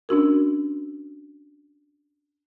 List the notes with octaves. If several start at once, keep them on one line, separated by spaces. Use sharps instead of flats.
C#4 D4 F#4 A#4